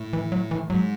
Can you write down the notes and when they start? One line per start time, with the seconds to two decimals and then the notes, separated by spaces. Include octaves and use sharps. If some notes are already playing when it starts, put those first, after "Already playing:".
Already playing: A2
0.13 E3
0.32 F#3
0.51 E3
0.70 G#2 F#3